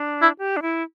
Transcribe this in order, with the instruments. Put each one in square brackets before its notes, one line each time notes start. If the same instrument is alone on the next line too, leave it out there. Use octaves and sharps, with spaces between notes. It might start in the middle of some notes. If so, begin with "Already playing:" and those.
Already playing: [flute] D4
[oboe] E4
[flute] G4
D4
E4